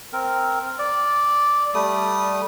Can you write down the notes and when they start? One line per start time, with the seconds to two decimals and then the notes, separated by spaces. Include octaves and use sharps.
0.13 C4 A#4
0.79 D5
1.74 G3 A3 D#6